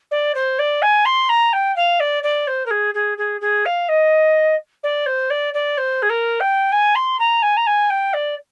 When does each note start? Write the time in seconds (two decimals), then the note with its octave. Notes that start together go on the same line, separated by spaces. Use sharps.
0.11 D5
0.35 C5
0.59 D5
0.82 G#5
1.05 C6
1.29 A#5
1.53 G5
1.76 F5
2.00 D5
2.23 D5
2.47 C5
2.66 A#4
2.70 G#4
2.94 G#4
3.18 G#4
3.41 G#4
3.65 F5
3.89 D#5
4.83 D5
5.06 C5
5.30 D5
5.54 D5
5.78 C5
6.02 G#4
6.10 A#4
6.40 G5
6.72 G#5
6.95 C6
7.19 A#5
7.42 G#5
7.57 A#5
7.67 G#5
7.90 G5
8.13 D5